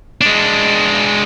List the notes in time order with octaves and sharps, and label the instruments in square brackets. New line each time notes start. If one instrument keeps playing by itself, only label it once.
[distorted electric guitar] G#3 D4